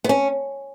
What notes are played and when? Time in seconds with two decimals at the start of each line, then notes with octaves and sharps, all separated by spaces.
0.04 B3
0.09 C#4